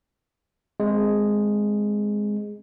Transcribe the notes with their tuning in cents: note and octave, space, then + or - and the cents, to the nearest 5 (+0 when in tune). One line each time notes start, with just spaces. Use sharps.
G#3 +0 C4 +0